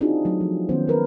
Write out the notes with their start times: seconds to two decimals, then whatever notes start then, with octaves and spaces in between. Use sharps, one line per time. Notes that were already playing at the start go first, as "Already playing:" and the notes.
0.01 C4 D4 D#4 F4 F#4 G#4
0.25 F#3 A3
0.41 F3
0.69 D#3 A3 B3 C#4 C5
0.88 A3 A#4 B4